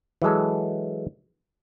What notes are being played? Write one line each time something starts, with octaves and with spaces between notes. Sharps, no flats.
E3 F#3 G#3 A4